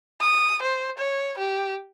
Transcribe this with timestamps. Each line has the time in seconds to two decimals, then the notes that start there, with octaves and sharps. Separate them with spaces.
0.21 D#6
0.62 C5
0.98 C#5
1.38 G4